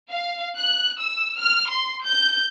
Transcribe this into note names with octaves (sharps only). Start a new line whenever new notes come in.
F5
F#6
E6
F6
C6
G6